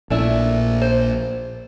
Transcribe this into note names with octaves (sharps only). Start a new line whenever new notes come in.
A#1 A#2 A3 D4 E4
C5